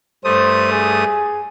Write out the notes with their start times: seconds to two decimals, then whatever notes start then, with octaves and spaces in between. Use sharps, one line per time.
0.24 G2 A3 C5 D#6
0.72 G#4